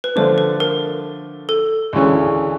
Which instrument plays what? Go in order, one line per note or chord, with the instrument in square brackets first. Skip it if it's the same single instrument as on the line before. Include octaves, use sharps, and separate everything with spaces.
[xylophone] B4
[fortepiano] D3 F3 A3 D4 [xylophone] C5
[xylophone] B4
A#4
A4
[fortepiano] D2 C#3 E3 G#3 C#4